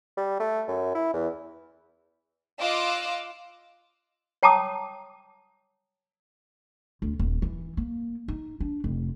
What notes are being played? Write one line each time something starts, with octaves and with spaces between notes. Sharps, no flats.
G3
A3
F#2
E4
E2
F4 D#5 F5 D6 E6 F#6
C#5 G5 A5 A#5 D6 D#6
D2
D#1
E3
A#3
D#4
D4
F1